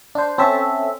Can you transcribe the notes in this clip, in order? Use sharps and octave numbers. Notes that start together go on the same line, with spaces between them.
D4 C5
C4 C#4 A4 E5